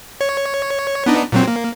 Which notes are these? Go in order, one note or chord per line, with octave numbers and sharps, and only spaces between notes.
C#5
B3 D4 D#4
A#2 F#3 C4
A#3